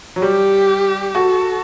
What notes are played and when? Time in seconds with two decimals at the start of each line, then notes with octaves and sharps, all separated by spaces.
0.16 F#3
0.22 G3 G4
1.15 F#4 A4